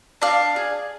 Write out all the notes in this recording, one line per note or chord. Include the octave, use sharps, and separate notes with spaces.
D4 D5 F5
G#4